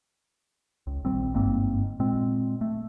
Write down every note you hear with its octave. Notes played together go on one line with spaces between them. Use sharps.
C#2
A#1 D#3 G3 C4
G1 G#2 A#3 C4
A#2 G#3 C4
A3